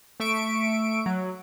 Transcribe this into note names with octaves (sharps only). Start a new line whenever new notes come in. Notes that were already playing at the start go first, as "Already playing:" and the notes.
A3 E5 C#6 D7
F#3